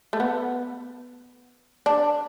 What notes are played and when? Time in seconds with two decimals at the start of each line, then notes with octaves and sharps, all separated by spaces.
0.13 A3
0.20 B3
1.86 D4